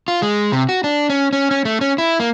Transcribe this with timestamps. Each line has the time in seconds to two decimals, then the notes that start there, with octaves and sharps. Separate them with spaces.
0.08 F4
0.22 G#3
0.52 C3
0.69 F#4
0.84 D4
1.10 C#4
1.33 C#4
1.51 C#4
1.65 A3
1.81 C#4
1.98 E4
2.20 A#3